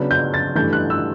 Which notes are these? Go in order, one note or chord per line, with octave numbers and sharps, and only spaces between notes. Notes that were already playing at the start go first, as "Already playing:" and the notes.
Already playing: C#3 F#3 B3 D4
G6
A6
G2 E3 A3 G6
F#6
E6